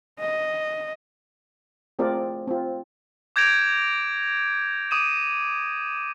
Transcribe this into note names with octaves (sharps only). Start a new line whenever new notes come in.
D#5
A3 C4 F4 G#4 A#4 D5
C4 F4
D6 G6 G#6 A#6 D7 F7
D6 D#6 D#7 E7